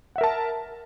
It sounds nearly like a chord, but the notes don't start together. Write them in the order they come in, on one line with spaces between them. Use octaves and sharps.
F#5 E5 A#4 A5